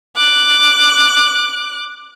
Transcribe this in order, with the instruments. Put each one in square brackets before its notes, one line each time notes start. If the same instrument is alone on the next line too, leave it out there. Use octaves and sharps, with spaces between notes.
[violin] D6 F#6